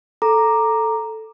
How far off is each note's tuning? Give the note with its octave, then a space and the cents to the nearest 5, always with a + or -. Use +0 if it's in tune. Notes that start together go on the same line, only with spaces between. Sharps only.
A4 +0 A#5 +0 D6 +10